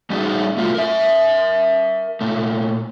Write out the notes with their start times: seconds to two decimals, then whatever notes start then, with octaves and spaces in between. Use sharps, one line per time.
0.10 G3 C#4 D#4 F#4 G#4 D5
0.57 A3 F4 F#4 A4
0.74 A#4 E5
2.21 A#2 A3